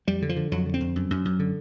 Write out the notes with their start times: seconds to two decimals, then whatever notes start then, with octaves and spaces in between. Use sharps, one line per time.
0.07 F2 G3
0.22 D3
0.29 F3
0.36 D3
0.52 F2 F#3
0.66 D3
0.74 C4
0.81 F2
0.96 F#2
1.11 F#2
1.25 F#2
1.39 D3